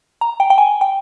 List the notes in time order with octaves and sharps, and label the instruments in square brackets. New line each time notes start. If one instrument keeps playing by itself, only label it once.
[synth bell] A#5
G5
G5
G#5
G5